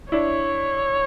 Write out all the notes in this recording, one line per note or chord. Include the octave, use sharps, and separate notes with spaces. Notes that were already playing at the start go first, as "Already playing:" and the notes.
D4 E4 C#5